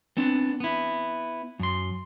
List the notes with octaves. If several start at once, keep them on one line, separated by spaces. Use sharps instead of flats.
B3 C4 D4
B3 E4
F#2 C6